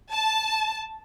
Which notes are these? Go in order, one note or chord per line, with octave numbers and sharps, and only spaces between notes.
A5